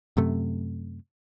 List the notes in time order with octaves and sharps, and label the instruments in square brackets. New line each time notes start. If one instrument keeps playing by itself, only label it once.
[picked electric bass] F#2 C3 A3